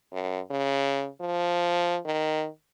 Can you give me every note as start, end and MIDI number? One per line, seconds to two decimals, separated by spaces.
0.12 0.40 42
0.50 1.07 49
1.21 1.99 53
2.05 2.47 51